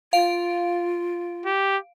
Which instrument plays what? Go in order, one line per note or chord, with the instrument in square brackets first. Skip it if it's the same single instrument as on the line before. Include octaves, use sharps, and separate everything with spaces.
[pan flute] F4 [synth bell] F5 D7
[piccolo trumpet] G4